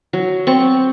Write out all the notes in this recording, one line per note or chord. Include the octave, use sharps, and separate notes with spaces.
F#3
C4 C#6